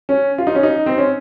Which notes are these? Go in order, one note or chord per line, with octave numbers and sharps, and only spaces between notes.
C#4
F4
D#4
C#4
D#4
C4
C#4